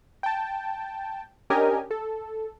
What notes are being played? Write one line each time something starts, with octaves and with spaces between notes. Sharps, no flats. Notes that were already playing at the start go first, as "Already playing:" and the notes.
G5 A5
C#4 D4 G4 A#4 D#5 G#5
A4